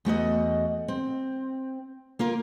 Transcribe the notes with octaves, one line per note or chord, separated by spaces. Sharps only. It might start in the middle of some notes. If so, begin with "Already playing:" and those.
E2 A3 F#4 D#5
C4
A#3 F4 A#4